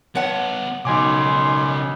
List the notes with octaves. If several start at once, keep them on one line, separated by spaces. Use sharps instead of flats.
B3 A4 C#5 F#5
B1 C#3 D#4 G#5 C6 D6